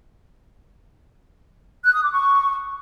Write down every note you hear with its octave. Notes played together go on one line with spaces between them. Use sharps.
F#6
D#6
D6
C#6